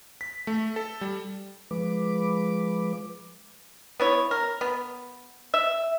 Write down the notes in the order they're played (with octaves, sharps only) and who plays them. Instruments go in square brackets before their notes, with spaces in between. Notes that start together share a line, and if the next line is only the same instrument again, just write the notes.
[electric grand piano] B6
A3
A4
G3
[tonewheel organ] F3 G#3 B4 D6
[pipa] B3 E4 C#5
A#4
B3
E5